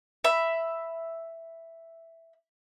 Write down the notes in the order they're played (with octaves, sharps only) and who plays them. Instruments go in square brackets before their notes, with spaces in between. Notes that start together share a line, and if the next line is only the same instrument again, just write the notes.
[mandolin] E5 B5